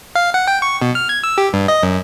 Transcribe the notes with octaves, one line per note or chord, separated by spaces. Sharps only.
F5
F#5
G5
C#6
B2
F6
G#6
E6
G4
G2
D#5
F#2